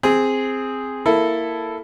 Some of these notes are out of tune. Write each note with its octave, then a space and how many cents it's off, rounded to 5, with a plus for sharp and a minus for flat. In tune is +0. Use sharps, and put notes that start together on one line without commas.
C4 +0 G#4 +0
A#3 -5 E4 +5 A4 +0